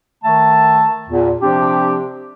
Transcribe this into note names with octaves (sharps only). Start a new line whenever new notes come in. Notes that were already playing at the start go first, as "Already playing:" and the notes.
D#3 A3 E5 A5
E2 A#2
C3 F3 C4 D4 G4